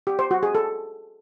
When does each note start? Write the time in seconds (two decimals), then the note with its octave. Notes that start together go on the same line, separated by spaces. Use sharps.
0.07 G4
0.19 C5
0.31 F#4
0.43 G#4
0.55 A4